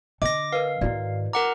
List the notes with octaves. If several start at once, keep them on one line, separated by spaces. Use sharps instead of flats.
D3 D#5 D6 A#6
A#4 B4 F5
G#2 D#3 E4 F#4 D5
A#4 F#5 A#5 D6